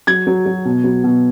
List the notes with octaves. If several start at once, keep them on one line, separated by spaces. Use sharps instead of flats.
F#3 G#6
F#3
F#3
B2
F#3
B2